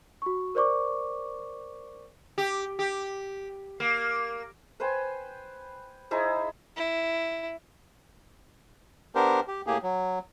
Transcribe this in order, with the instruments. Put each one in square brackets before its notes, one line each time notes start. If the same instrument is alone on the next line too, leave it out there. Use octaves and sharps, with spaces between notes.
[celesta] F#4 C#6
A#4 C5 D5 C#6 D6
[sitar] G4
G4
A#3
[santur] B4 C5 G5 G#5
D#4 E4 G#4 C5
[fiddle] E4
[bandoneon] B3 D4 G4 A#4 C5
G4
A2 A#3 G4 G#4
F#3